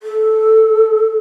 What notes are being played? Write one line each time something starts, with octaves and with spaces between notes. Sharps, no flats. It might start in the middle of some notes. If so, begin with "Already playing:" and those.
A4